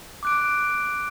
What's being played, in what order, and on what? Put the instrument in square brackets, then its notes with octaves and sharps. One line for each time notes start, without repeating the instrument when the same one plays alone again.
[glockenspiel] D6 F#6 D7